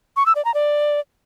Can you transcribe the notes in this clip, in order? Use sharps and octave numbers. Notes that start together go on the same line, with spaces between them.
C#6
E6
D5
A#5
D5